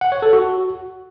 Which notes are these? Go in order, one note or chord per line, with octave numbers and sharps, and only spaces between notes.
F#5
C#5
A4
F#4